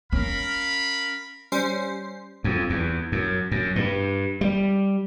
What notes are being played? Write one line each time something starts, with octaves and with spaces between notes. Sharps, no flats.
C#4 A#4 F5 B5
G3 C#4 C5 C7
F2
E2
F#2
F#2
G2
G3